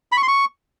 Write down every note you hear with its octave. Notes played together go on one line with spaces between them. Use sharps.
B5
C#6
C6
C#6